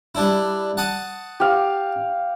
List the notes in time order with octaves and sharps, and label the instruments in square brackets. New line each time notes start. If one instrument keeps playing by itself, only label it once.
[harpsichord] G3 D4 E4
F#5 A5 D#6
[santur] G4 F5